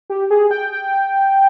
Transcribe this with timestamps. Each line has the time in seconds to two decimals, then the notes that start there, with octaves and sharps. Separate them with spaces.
0.10 G4
0.30 G#4
0.51 G5
0.71 G5